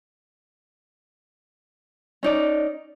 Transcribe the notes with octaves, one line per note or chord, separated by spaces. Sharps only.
C#4 D#4 D5